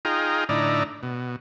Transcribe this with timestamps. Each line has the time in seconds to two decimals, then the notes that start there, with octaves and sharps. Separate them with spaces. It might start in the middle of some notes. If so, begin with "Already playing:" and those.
0.05 D#4 F4 G#4 G5 A#5
0.49 A2 D3 D#4 E4 D5 A#5
1.03 B2